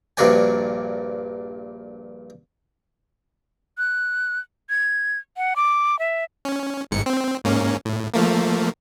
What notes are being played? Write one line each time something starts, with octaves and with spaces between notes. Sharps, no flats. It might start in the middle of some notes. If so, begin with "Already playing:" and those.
A#1 G2 A#3 F#4 D5 G#5
F#6
G#6
F#5
D6
E5
C#4
G1 G#2 C#7
C4
G#2 A#3 C#4
A2
F3 A3 A#3